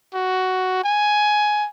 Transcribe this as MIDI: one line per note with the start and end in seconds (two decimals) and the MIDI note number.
0.14 0.82 66
0.84 1.67 80